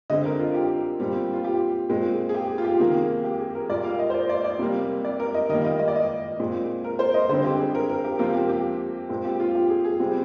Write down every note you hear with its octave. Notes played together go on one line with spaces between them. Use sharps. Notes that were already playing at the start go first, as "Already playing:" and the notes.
D3 G#3 C4 D#5
A#4
F4
G4
A#2 G3 C4
F4
G4
A#2 G#3 C4
G#4
G4
F4
G4
C3 D#3 A#3 G#4
G4
G#4
A#4
A#2 G3 A#3 D5
F5
D#5
C5
D5
D5
D5
C3 G3 A#3
D5
A#4
D#5
D#3 G3 A#3 D#5
D#5
D#5
D5
D#5
A#2 G#3 C4
A#4
C5
D#5
D3 G3 C4 C5
G4
G#4
A#4
A#4
G4
C3 F3 A#3 F4
G4
G4
A#2 G#3 C4
G4
F4
G4
G#4
G#4
C3 G3 C4